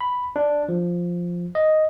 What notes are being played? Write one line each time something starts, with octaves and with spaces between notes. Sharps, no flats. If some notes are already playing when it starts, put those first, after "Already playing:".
B5
D4
F3
D#5